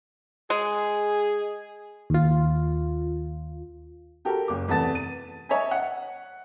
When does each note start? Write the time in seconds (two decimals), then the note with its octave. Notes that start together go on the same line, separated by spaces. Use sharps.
0.50 G#3 G#4
2.10 D#2 F4
4.25 F#4 G4 A4 A#4
4.48 F#1 D6
4.68 E2 C3 A3 B3 A5 A6
4.95 D#7
5.49 C#5 D#5 E5 G#5
5.71 F#5